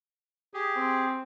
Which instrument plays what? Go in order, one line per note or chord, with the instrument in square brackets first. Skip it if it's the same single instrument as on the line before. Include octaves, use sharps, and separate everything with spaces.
[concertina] G4 G#4
[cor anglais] C4